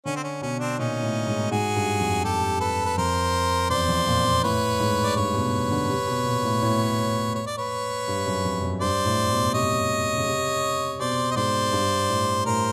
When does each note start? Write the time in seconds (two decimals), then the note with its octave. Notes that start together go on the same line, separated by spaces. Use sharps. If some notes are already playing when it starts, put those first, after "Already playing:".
0.06 D3 C#4
0.16 C4
0.24 C#4
0.41 B2 C#4
0.60 C4 D4
0.78 A#2 C#4 D#4
1.02 A2
1.27 G#2
1.51 G#2 F#4 G#4
1.76 G2
2.00 F2
2.24 G4 A4
2.60 A4 B4
2.85 B4
2.97 F2 A#4 C5
3.70 E2 C5 D5
3.88 F2
4.07 A#2
4.25 A#2
4.43 A2 B4 C#5
4.80 G#2
5.04 D5
5.16 G2 B4 C#5
5.34 B2
5.71 D3
5.89 C3
6.07 B2
6.25 A#2
6.44 A2
6.62 A2
7.35 C#5
7.46 D5
7.58 B4 C#5
8.08 G2
8.26 F#2
8.45 F2
8.62 F#2
8.80 G2 C5 D5
9.05 A2
9.30 B2
9.54 C3 C#5 D#5
10.17 C#3
10.27 C3
11.00 B2 C5 D5
11.31 D#5
11.36 G#2 C5 D5
11.73 G2
12.09 A2
12.46 A2 A#4 C5